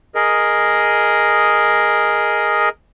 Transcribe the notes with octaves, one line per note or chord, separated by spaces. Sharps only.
G#4 A#4 D#5